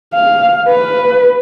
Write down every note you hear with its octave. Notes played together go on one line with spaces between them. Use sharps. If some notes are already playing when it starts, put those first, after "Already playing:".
F5
B4